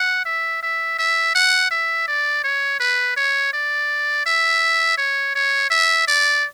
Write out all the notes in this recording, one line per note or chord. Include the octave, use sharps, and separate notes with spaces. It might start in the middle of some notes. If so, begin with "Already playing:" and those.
Already playing: F#5
E5
E5
E5
F#5
E5
D5
C#5
B4
C#5
D5
E5
C#5
C#5
E5
D5